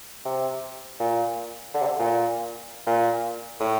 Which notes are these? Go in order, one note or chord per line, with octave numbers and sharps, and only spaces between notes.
C3
A#2
D3
C3
D3
A#2
A#2
A2